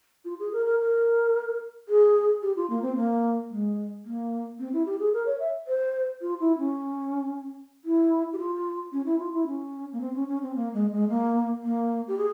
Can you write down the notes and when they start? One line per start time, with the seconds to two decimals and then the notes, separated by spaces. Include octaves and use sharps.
0.25 F4
0.39 G#4
0.53 A#4
0.66 A#4
0.80 A#4
1.89 G#4
2.42 G4
2.56 F4
2.70 A#3
2.82 C4
2.96 A#3
3.50 G#3
4.05 A#3
4.59 C4
4.73 E4
4.86 G4
5.00 G#4
5.13 A#4
5.26 C#5
5.40 E5
5.68 C5
6.21 F4
6.40 E4
6.58 C#4
7.85 E4
8.33 G4
8.39 F4
8.92 C#4
9.06 E4
9.19 F4
9.33 E4
9.47 C#4
9.93 A#3
10.00 C4
10.15 C#4
10.29 C#4
10.42 C4
10.56 A#3
10.74 G#3
10.92 G#3
11.09 A#3
11.63 A#3
12.08 G4
12.18 G#4